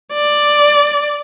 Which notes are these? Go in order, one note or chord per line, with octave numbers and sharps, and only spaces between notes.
D5